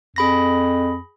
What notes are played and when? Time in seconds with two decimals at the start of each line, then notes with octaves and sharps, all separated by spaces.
0.16 F2 G#4 B5 A#6